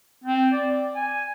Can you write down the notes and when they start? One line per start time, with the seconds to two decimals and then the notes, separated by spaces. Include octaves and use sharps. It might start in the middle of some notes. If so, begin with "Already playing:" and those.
0.24 C4
0.53 D5
0.95 G#5